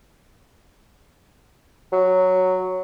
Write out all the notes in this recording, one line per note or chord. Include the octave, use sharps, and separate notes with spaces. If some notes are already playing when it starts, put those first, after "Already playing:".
F#3